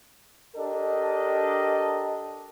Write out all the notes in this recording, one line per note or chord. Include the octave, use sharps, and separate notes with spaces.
D4 G4 A4 A#4 D#5